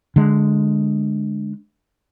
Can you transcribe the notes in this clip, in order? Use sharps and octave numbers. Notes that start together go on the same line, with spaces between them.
D3 G#3